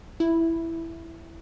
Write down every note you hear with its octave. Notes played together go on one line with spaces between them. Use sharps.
E4